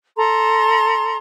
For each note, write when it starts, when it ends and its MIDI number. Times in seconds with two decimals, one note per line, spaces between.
0.17 1.16 69
0.17 1.16 82
0.17 1.16 84